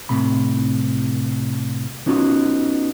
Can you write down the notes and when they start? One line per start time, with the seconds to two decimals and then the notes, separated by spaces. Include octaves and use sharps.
0.09 C2 A2 C3 B5
2.06 B3 C#4 D#4 F4 F#4